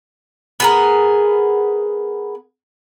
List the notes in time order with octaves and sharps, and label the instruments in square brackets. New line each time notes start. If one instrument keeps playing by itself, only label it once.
[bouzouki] B3 G#4 A#4